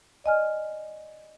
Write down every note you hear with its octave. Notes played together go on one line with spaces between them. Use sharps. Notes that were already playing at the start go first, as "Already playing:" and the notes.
D5 D#5 G#5 F6